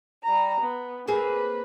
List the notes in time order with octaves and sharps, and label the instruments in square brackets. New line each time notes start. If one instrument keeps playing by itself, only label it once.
[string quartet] G3 A#5
B3
[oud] A#3 C4 G#4 [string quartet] B4